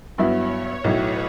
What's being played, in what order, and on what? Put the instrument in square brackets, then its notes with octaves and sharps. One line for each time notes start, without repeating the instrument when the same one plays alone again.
[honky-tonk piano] G2 F#3 B3 E4 [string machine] C#5
[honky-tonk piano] B1 A2 F#3 [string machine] B4